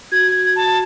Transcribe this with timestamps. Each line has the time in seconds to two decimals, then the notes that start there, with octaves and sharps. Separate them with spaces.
0.12 F#4 G#6
0.56 A5